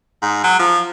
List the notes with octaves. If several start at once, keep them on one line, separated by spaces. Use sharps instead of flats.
G#2
F#3
F3